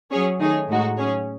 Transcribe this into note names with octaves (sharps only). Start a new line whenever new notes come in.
F#3 C#4 G#4 C#5
D#3 A3 D#4 G#4 C#5
A2 G#3 D#4 F#4
F#3 C#4 G#4 C#5